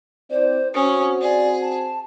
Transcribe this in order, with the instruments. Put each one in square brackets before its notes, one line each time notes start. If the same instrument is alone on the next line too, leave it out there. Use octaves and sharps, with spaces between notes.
[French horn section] C4 E4 D5 [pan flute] C5
[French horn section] C4 F#4 C5 [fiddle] C#4 [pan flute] D#6
[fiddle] G#4 [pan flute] D5
[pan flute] A5